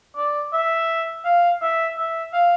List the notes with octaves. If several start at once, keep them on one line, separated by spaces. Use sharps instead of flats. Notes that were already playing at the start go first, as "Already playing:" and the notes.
D5
E5
F5
E5
E5
F5